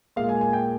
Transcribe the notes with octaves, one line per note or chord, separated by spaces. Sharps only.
A#2 G#3 F5
G#5
G#5
G5